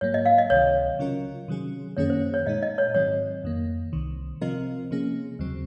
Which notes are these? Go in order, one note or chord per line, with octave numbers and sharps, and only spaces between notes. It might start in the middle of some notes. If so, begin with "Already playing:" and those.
G#2 F#3 A#3 C#5
D#5
F5
D#5
C#2 C3 D#3 F#3 C#5
C#3 F#3 C#4 F4 A#4
C3 D#3 F#3 C#4 G#4
F#2 D#3 A#3 C#4 G#4 C#5
C5
C5
C#5
A#2 G#3 D#4 D#5
D#5
C#5
G#2 D#3 F#3 C4 C#5
F2 D#3 A#3
C2 C3 D#3
C3 F3 C4 F4 A#4 D#5
C3 F3 A#3 C#4 G#4
D#2 C#3 F#3 C4